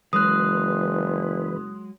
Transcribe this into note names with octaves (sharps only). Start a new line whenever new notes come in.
F#1 E3 F#3 G#3 B4 D#6 F#6